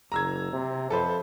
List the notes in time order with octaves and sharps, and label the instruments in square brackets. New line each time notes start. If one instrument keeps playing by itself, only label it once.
[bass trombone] F#1 [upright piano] A#5 E6 G#6
[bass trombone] C3
[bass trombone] F2 [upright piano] A4 B4 C5